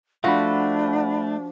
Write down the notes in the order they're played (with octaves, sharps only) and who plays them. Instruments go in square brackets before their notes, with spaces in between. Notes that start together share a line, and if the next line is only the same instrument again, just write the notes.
[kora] F3 F#4 [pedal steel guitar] A3 [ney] D4 [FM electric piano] F#5 B5